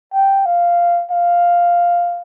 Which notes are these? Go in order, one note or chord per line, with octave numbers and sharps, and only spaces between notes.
G5
F5
F5